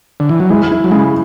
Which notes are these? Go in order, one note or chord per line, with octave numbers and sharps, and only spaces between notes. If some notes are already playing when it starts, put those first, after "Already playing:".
D3
E3
F#3
G#3 E4
E4
F#3
C#3 G#3